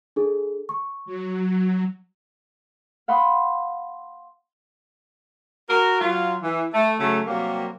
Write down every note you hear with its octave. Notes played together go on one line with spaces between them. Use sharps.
D4 G#4 A4
C#6
F#3
F5 F#5 B5 C6 D#6
F#4 A#4
F#3 F4
E3
A3
C#3 F#3 A3
C3 F#3 G3 A#3